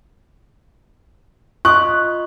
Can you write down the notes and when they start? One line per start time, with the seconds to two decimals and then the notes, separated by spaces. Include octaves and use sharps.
1.65 F4 D#5 C6 C#6 D#6 F#6